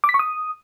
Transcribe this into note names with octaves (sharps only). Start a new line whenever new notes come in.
D6
B6
C#6
D#6